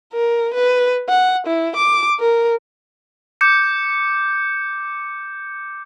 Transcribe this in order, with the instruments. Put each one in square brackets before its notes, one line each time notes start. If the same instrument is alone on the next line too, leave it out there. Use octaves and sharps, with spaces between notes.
[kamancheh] A#4
B4
F#5
E4
D6
A#4
[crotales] D6 G6 C#7